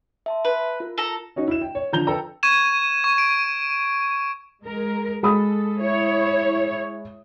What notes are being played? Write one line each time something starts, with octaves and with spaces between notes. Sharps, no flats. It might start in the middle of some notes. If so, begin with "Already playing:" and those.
E5 A5 C6
B4
F4 A#4
A4 A#5
C#4 D#4 F#4
E4 E7
G5
C#5
D3 F3 A#5 G6 F7 G7
A4 B4 G5 A#5 E6
C#6 G#6 D#7 E7
C#6
D7
G#3 A#4
G#3 A4 B5 D#6
E4 C#5